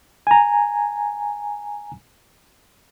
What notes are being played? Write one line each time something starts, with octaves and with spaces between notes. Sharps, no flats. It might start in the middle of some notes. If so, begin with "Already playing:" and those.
G#5 A#5